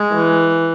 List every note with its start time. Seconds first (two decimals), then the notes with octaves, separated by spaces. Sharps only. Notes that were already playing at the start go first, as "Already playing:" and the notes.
Already playing: G#3
0.14 E3